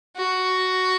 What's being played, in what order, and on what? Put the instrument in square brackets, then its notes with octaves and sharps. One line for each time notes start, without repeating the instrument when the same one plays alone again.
[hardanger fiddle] F#4